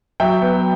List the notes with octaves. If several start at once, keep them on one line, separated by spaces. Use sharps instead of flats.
F#3 E5 G5
B3